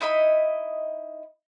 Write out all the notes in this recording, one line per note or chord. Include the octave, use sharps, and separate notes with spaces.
D#4 E4 D#5 B5